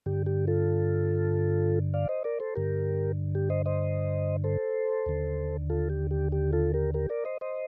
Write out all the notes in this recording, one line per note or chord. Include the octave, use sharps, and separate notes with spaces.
G2 D3 G4
G4
F4 A4
D5 F5
C5 D#5
A#4 D5
A4 C5
G2 D3 G4 A#4
G4
C5 D#5
C5 D#5
A4 C5
D#2 D3
F4 A4
G4
G4
G4
F4 A4
G4 A#4
G4 A#4
A#4 D5
C5 D#5
C5 D#5